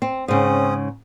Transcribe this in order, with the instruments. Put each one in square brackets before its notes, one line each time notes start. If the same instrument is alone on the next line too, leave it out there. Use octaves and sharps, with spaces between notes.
[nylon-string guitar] C4
[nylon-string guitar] G#2 C#3 [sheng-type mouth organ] C4 C#4 D#6